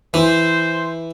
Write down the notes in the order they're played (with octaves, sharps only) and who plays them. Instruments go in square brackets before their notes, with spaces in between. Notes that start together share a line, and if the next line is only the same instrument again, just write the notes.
[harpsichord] E3 [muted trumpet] C5